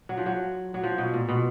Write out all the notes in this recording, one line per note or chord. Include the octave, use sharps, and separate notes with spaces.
F#3
F3
F#3
F#3
F3
B2
A#2
B2